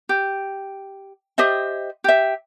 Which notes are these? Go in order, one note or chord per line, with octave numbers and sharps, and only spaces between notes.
G4
G4 C5 D#5 E5
G4 E5